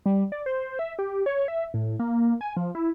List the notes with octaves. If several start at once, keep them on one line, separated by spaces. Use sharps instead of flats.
G3
D5
C5
E5
G4
C#5
E5
A2
A#3
G#5
F3
E4